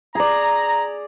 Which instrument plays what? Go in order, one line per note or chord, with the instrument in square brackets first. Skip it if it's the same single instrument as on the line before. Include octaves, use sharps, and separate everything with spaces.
[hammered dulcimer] G#4 D5 [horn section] A#5